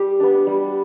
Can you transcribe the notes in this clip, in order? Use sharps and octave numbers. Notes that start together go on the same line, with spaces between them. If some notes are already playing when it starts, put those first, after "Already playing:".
Already playing: G3 G4
B3 D4
G3